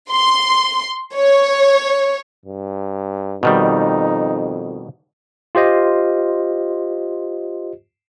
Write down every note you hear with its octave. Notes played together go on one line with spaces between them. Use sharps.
C6
C#5
G2
F2 B2 D#3 G3 D#4
F4 G4 C5 D#5